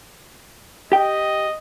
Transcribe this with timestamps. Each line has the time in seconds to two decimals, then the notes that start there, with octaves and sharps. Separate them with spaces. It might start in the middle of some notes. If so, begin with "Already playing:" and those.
0.92 G4 D#5 G5